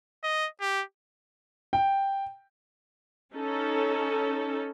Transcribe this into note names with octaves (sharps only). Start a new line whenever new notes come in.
D#5
G4
G5
C#4 D#4 A4